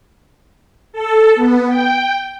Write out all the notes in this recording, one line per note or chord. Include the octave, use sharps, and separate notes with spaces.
A4
B3
G5